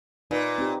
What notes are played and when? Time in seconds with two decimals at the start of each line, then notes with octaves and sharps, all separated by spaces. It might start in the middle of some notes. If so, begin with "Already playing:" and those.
0.31 A#2 D#4 B4
0.58 C4 D#4 G4